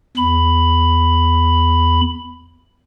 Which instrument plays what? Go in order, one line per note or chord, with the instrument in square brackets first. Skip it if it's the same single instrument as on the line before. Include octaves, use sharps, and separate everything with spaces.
[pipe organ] E2 B5